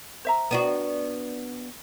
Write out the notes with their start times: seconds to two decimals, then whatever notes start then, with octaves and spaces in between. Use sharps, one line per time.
0.25 C5 E5 A#5
0.51 B3 D4 F#4